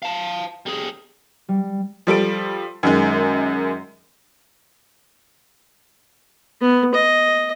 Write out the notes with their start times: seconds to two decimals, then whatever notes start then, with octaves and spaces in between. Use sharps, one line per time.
0.02 F5 A5
0.66 G3 G#4
1.49 G3
2.07 F3 G3 A4 D7
2.83 F#2 D#3 G#3
6.61 B3
6.94 D#5